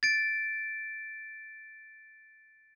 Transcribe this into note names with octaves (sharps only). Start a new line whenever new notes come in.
A6 D7